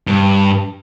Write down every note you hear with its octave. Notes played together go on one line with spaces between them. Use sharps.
G2